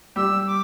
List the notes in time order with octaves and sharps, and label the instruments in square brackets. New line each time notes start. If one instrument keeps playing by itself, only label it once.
[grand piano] G3 G4 [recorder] E6
[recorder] D6